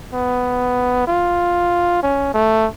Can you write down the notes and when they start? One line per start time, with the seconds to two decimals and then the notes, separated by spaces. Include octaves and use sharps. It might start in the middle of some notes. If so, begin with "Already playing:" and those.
0.13 B3
1.08 F4
2.03 C#4
2.34 A3